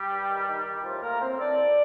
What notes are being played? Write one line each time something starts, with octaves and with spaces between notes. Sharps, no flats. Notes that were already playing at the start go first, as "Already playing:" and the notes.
Already playing: G3 G4
G2
D#3
D#3
D#3
A2 F3 F4
A2 A#3 A#4
A2 C4 C5
A2 D4 D5
A2